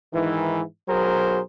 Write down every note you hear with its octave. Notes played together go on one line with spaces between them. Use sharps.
G#2 D#3 E3
B1 F#3 G#4 A#4 C5